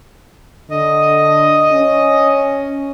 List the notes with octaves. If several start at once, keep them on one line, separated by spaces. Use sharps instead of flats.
D3 D#5
C#4